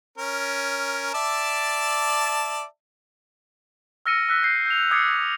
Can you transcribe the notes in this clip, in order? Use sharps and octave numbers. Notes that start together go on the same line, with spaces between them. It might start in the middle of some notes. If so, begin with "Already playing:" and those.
C#4 A#4
D5 E5 A5
E6 F6 A#6 C#7 D#7
E6 F#6 B6
G6 C7
G6 F7
D6 D#6 G#6 A6 C7 C#7
G#6